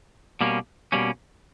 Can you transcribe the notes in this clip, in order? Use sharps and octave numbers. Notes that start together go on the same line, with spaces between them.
B2 G3 A#3 C#4
B2 G3 A#3 C#4